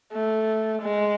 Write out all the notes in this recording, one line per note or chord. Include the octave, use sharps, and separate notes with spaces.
A3
G#3